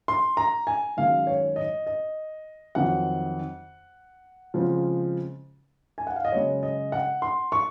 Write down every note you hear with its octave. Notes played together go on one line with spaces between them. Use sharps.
C6
A#5
G#5
F#2 D#3 G#3 F5
C#5
D#5
D#5
F2 D#3 F#3 F#5
C#3 F3 G#3 C4
G#5
F#5
F5
D#5
F#2 C#3 G#3 C#5
D#5
F#5
C6
C#6